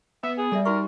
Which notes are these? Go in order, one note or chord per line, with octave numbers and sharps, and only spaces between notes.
B3 E5
G#4
G3 A4 D5 E5
D#4 F#4 A#4 C#6